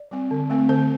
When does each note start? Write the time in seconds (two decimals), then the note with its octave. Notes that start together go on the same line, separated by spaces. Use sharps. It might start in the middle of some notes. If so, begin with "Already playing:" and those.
Already playing: D5
0.11 G3 C4
0.31 D3
0.50 A3 C4
0.69 D3 C5